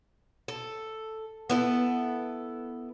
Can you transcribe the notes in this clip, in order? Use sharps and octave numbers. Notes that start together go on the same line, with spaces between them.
A4
B3 E4 A4